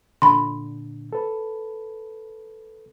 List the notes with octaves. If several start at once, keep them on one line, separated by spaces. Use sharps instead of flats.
A#2 D3 B5 C6
A4 B4